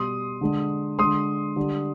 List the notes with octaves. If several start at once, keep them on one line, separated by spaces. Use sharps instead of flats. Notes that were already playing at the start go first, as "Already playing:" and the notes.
Already playing: B2 G3 C6 D#6
D3 G#3
D3 G#3 C6 D#6
D3 G3